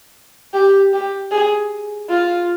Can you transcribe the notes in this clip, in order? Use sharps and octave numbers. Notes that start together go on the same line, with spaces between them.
G4
G4
G#4
F4